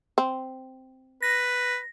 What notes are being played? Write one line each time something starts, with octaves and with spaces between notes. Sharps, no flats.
C4
B4 A#6